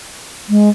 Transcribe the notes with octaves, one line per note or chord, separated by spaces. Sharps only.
G#3